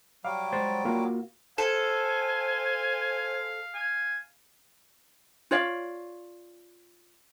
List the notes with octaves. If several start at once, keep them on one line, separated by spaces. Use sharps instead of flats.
F#3 G3 F5 D6
G#3 C5 A6
A#3 F4 F#4
A4 C5 F5 G#5
G#5
F4 C#5 D5 F5